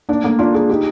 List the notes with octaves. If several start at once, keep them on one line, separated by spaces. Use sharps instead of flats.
A#3 D4
A#3 D4
D4 F4
F4 G#4
D#4 G4